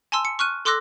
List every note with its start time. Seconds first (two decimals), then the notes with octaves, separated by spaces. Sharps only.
0.12 G#5 A5 C6 E6
0.25 C#7
0.39 C#6 F6 F#6 D#7
0.65 A4 C6 D6 E6 F#6 A#6